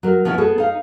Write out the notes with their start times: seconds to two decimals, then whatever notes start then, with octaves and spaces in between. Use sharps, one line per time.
0.03 F#3 A#4
0.25 F3 B3 C#4 E4
0.38 B3 G#4 A4
0.58 D#4 F5